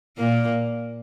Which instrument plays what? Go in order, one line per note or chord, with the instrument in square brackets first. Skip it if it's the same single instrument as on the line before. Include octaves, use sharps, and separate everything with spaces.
[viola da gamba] A#2 A#3